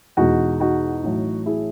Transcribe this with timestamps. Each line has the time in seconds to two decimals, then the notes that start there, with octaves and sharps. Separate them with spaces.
0.17 E2 B2 G#3 D#4 F#4
0.60 D#4 F#4
1.03 A1 A2 F#3
1.46 E4 G#4